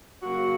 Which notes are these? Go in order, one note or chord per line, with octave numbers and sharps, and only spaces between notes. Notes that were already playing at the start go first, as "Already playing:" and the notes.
C#3 F#3 A#3 F#4